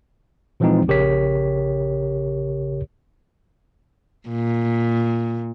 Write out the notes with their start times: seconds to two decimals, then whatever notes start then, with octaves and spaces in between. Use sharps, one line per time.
0.60 A#2 E3 F3 G#3 C4 D#4
0.88 A#1 C#3 G4 A#4 C#5 B6
4.29 A#2